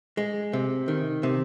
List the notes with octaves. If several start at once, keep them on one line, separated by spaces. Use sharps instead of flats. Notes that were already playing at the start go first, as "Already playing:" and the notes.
G#3
C3
D#3
C3